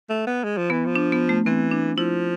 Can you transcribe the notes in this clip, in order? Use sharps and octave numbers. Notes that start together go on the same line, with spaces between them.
A3
B3
G#3
F3
E3 B3
F3
D4
B3
A3
E3 C4
D4
F3 E4